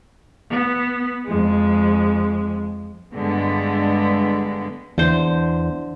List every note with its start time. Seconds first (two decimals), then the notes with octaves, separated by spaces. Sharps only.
0.50 B3
1.26 F2 G#3
3.14 G2 D3 G#3 B3
4.98 E2 D3 C5